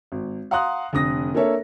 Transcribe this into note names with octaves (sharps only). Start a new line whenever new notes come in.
G#1
F5 F#5 A#5 C6 D#6 F#6
F1 D3 D#6 A#6
A#3 D4 A4 A#4 C#5 E5